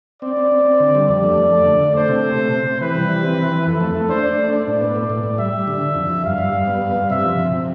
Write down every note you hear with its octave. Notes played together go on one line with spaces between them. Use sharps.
C4 D5
C4
C4
C4
D3
G3
F2 D5
A3
F2
A3
D3
D3
A3 C5
C3
A3
C3
C3
C3
E3 B4
G3
E3
C4
E3
E3
F2 A4
A3
A3
D4 C5
D4
A3
D4 D5
A2
B3
A2
A2
A2
G3 E5
G3
D3
D3
F2
F2
G2 F5
G2
G2
B3
G2
G2
C3 E5
F3
C3
C3